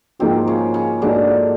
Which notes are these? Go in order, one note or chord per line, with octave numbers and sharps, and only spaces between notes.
G#2 C3 F3 A#3 C4 D#4 F#4
C#3 C#4
C#3 C#4
G#2 D3 F3 A#3 D4 D#4 F#4